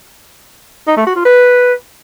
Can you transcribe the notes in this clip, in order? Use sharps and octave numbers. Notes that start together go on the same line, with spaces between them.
D#4
A3
F#4
F4
B4